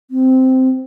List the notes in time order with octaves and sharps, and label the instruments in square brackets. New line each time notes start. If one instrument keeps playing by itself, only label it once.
[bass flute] C4